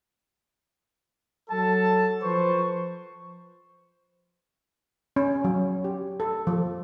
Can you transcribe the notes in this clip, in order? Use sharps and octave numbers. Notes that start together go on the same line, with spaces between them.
F#3 A4 A5
F3 B4 C5 C#6
C#4
F#3
G4
A4
F3